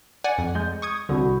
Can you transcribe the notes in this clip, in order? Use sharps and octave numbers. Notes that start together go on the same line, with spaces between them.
D5 F#5 G#5
F2
G#3 G6
C#6 D#6 G#6
C2 D3 F#4 B5